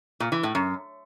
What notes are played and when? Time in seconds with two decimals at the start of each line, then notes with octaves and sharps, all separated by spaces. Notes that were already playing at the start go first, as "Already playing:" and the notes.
0.20 A#2
0.32 E3
0.43 A2
0.55 F#2